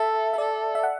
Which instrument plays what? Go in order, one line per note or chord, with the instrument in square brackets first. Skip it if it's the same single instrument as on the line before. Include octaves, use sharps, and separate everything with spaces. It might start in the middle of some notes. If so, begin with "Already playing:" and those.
Already playing: [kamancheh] A4 [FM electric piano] E5
[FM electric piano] E5
[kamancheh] A4 [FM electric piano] D5
[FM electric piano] E5
F#5